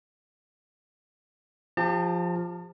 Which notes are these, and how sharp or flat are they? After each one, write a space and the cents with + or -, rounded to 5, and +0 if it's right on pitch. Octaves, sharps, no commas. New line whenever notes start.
F3 +0 G4 +35 A5 +45